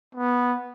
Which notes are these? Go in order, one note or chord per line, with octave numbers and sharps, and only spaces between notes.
B3